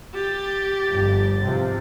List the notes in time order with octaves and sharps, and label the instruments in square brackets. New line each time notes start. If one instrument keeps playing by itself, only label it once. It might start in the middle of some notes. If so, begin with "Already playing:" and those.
[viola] G4 [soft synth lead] A6
[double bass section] G1 F2
G#2 C3 F3